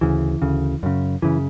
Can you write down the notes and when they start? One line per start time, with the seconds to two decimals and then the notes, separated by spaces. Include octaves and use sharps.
0.01 D2 C#3 E3
0.42 D2 C#3
0.83 F#2 C#3
1.22 F#2 C#3 E3